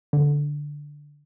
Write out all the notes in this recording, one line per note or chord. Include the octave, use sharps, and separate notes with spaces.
D3